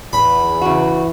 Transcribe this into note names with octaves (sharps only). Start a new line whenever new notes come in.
E2 B5
C#3 E3 F#4